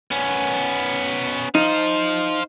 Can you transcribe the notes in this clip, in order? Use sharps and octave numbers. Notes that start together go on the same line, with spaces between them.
B3 C#4
D#4 C5 F5